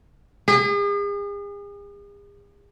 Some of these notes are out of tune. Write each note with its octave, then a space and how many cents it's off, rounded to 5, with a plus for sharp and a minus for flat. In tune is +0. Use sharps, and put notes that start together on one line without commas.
G#4 -40